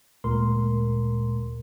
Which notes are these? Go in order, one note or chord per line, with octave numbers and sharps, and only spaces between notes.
D2 A#2 G#3 A#4 C6